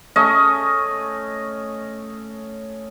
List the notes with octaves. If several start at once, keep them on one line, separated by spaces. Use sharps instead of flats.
A3 C#4 D#5